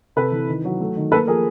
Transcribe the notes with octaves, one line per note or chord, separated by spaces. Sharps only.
C3 A4 B4
E3
D#3
F#3
A3
D#3
A#3 A4 B4
F3 G#4 A#4